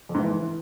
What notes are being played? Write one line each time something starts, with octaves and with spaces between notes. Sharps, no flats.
F2
G#2
E3